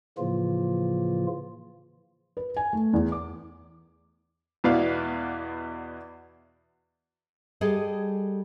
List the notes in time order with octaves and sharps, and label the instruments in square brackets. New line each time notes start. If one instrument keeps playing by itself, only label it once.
[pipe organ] A2 C#3 E3 F3 A#3 F4
[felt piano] B4
G#5
A3
E2
D6
[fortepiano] E2 B2 E4 B4 D5 F5
[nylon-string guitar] G3 G#4 A4 D#5